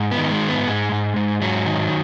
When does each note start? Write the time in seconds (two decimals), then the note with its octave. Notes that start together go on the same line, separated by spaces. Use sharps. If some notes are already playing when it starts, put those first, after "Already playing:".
Already playing: G#2
0.12 B3
0.18 D#3
0.31 G#3
0.42 G#2
0.49 B3
0.67 G#2 G#3
0.92 G#2
1.16 G#2
1.41 G#2 F#3
1.66 D#3